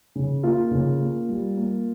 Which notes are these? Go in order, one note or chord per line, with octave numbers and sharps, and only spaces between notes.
C#3
A#3 F4
C#3
A#3
G3
A#3